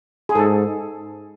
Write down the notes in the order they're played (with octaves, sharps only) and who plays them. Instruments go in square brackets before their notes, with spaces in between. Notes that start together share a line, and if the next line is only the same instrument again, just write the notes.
[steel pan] G#4
[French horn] G#2 [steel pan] A4